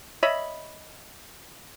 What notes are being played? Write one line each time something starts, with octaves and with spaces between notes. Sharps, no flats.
C#5 D#5 E5 B5